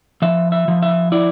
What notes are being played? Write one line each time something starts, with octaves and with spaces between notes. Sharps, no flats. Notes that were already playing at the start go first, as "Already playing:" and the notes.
F3 E5
E5
F3
E5
E4 D5